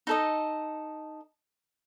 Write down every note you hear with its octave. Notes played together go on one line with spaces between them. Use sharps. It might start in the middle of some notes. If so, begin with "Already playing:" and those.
D#4 A4 D#5